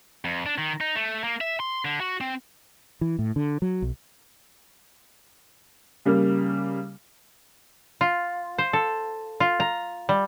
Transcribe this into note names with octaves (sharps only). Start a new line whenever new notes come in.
F2
D4
D#3
D#4
A3
A#3
E5
C6
D3
F#4
C4
E3
A2
D3
F#3
B1
C#3 G3 A#3
F4
C5
A4
F4
A#5
G3